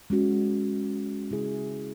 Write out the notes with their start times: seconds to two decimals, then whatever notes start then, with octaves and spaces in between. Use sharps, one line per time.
0.10 G#3 C#4 F#4
1.31 C#3 G#3 E4 G#4